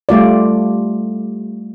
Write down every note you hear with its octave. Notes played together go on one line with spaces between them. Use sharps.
G3 A3 F4 D5